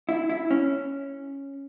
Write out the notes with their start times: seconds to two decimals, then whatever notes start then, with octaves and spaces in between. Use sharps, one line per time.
0.09 E4
0.30 E4
0.51 C#4